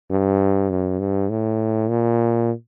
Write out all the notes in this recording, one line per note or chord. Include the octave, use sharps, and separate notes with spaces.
G2
F#2
G2
A2
A#2